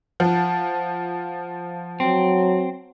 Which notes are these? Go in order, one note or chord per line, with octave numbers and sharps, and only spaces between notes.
F3 F#5 A5
F#3 C4